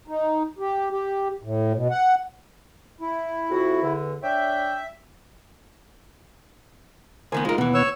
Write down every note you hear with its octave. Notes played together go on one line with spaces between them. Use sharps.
D#4
G4
G4
A2
B2
F#5
E4
F2 F#4
E2 D3
D4 C#5 E5 G5
C#2 D#3 B3 A#4 C5 G#5
G#3 D#4 F4 A#4
D#2 B2 E3 B3 F#5
C#5 E6